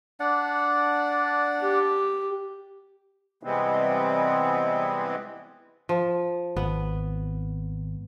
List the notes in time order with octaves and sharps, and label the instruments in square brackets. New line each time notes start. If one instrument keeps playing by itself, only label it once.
[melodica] D4 D5 F#5
[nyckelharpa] G4
[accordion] C3 E3 G3 G#3 B3 C4
[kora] F3
[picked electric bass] G#1 [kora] B3